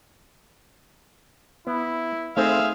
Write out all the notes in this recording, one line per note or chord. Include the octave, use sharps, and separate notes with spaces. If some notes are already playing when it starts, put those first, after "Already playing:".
B3 E4
A3 C4 D#4 G#4 C5 E5 F5